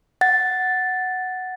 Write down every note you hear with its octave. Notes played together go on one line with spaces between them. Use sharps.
F#5 A6